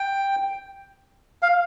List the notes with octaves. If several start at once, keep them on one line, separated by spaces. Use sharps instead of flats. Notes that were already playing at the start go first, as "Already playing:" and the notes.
Already playing: G5
F5